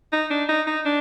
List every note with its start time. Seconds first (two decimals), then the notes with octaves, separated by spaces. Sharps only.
0.13 D#4
0.31 D4
0.49 D#4
0.67 D#4
0.85 D4